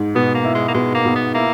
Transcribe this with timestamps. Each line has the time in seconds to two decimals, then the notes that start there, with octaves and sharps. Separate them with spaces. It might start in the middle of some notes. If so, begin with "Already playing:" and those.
Already playing: G#2
0.15 B2 B3
0.34 A#3
0.44 E4
0.55 G#3
0.68 A#3
0.74 B2 G#3
0.94 A#3
1.05 B2
1.16 B3
1.34 A#3 E4